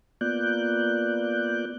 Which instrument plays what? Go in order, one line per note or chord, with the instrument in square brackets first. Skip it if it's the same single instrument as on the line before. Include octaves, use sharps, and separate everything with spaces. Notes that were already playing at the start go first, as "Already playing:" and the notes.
[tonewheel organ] A#3 B3 F4 D5 F#6 G6